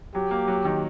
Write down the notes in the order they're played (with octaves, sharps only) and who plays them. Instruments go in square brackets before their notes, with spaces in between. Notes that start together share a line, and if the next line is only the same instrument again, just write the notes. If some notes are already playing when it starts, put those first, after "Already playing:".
[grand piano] F#3 [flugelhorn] G4
[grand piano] A#3
F#3
D#3